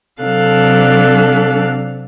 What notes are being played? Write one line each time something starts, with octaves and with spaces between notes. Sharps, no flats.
C3 F#3 D4 A4 F5 F#6